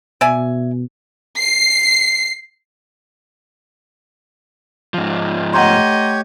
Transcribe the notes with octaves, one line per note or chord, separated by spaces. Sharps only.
B2 D5 E5 G#5
C7
G#2 F3
A3 G4 C#5 D#5 F#5 A#5 C6